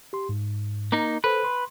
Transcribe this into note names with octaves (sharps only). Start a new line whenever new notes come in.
G4 C6
G#2
A#3 D#4
A4 B4 C5 B5
C6